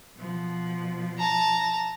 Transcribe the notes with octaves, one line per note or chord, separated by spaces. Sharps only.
B2 F3
A5 A#5